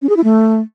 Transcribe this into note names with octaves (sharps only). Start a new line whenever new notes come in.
C#4
G#4
E4
A3